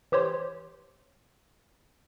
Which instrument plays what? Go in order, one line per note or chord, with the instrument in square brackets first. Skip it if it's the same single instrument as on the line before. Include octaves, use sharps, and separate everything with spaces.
[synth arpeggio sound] E3 G4 C5 C#5 C6